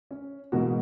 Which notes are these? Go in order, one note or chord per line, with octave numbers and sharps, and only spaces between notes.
C#4
G#2 B2 E3 A#3 F#4